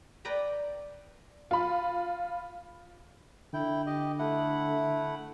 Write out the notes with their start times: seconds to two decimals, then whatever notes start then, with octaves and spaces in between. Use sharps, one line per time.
0.25 B4 D5 G5 A#5 B5
1.51 F4 B5
3.53 D3 E4 G5
3.86 G4 D#5
4.19 A3 E4 F#5